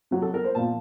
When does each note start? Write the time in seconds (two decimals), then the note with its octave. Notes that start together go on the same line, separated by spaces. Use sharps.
0.11 C3 F#3
0.22 A4
0.34 A#4
0.45 C5
0.55 A#2 F3 A5